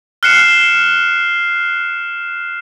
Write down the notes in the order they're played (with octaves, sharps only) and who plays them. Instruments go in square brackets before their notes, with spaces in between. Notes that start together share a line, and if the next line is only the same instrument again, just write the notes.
[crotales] F6 F#6 C7 C#7 E7